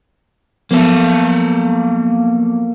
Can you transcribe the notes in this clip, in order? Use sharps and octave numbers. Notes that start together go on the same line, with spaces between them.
F3 F#3 A#3 B3 A4